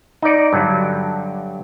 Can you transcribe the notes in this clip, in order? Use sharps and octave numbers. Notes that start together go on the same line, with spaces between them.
D#4 D5
G2 D3 F#3